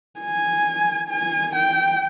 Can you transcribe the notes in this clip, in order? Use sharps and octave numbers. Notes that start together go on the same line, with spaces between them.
G#5
G#5
G5